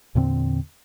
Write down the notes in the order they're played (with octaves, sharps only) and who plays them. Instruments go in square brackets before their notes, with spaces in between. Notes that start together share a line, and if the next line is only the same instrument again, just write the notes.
[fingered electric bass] E2 A#2 D3 C4